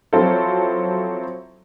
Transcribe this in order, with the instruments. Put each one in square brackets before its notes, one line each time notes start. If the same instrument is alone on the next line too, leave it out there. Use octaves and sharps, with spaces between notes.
[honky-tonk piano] F3 F#3 C4 E4 F4 A4